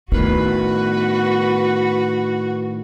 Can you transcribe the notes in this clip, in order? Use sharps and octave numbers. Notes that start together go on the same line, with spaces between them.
A2 D#3 B3 F#4 B4